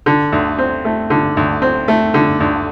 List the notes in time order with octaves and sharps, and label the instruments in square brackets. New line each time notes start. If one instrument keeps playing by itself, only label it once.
[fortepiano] D3
D2
C4
A3
D3
D2
C4
A3
D3
D2